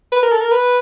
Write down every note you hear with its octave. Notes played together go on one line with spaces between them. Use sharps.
B4
A#4
A4
A#4
B4